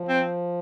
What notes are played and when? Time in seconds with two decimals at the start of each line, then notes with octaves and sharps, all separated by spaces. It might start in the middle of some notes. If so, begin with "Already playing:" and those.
Already playing: F3
0.09 C4